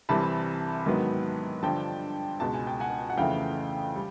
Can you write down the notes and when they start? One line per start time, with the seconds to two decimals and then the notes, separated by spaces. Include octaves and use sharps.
0.09 C2 C3 E3 G3 A5 B5
0.86 G#2 D#3 F#3 B3
1.63 G2 D3 F3 G5 A5
2.40 C#2 B2 G#3 A5
2.54 G#5
2.67 G5
2.80 F#5 G#5
3.10 F#5
3.17 F2 C#3 E3 A3 F5 G5
3.95 G3